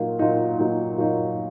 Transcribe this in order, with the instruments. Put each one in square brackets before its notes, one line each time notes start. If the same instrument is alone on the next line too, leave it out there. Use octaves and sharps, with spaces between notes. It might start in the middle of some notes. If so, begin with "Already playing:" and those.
Already playing: [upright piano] A#2 F#3 A#3 D#4
A#2 F#3 A#3 D#4
A#2 F#3 A#3 D#4
A#2 F#3 A#3 D#4